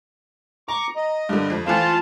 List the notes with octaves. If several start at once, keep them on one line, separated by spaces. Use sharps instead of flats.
A#5 C#6 D6
D#5
G2 D3
F2
E3 A3 C4 F4 F5 A5